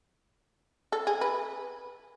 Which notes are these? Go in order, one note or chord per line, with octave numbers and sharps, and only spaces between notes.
A4
G#4
B4